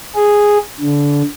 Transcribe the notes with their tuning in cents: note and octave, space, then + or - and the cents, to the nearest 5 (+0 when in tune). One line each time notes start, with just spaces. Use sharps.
G#4 -5
D3 -25